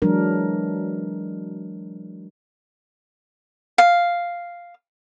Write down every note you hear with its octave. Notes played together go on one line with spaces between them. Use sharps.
E3 F#3 G#3 D4 A#4
F5